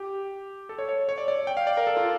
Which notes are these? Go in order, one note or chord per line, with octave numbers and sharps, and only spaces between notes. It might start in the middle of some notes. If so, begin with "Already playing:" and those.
Already playing: G4
A4
C#5
C#5
C#5
D5
D5
G5
F5
D5
A#4
A4
F4